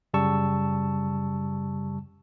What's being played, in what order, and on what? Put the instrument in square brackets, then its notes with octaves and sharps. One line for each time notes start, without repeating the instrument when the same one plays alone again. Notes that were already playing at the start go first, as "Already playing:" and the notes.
[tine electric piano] F#2 C#3 G3 A5 C#6 E6